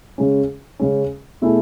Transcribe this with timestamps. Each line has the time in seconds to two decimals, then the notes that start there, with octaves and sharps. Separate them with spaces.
0.18 C#3 G#3 C#4
0.80 C#3 G#3 C#4
1.42 B2 A3 E4 G#4